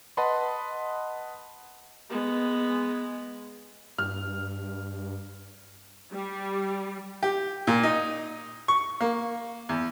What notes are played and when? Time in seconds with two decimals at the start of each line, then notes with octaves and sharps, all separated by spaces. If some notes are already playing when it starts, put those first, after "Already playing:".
0.17 B4 D#5 F#5 A5 B5 C6
2.10 G#3 B3
3.98 G2 F6
6.12 G3
7.23 G4
7.67 A#2
7.83 D#4
8.68 C#6
9.01 A#3
9.69 E2